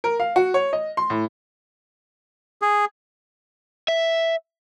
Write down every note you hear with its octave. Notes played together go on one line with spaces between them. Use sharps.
A#4
F5
F#4
C#5
D#5
C6
A2
G#4
E5